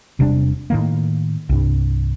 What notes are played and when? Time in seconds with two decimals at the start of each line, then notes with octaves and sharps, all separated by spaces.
0.19 E1 C3 G3 D4
0.70 A2 D#3 A#3
1.49 C2 G2